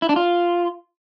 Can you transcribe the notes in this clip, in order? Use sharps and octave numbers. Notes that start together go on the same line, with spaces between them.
E4
D4
F4